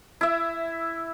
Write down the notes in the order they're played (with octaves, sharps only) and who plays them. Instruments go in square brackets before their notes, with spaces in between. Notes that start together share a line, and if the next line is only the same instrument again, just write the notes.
[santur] E4 E5